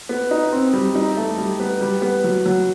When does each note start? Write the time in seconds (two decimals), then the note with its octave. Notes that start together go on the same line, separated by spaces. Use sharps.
0.09 B3
0.31 D#4
0.52 C4
0.73 G3
0.95 D#4
1.17 A3
1.38 G3
1.60 B3
1.81 G3
2.02 B3
2.24 F#3
2.46 F#3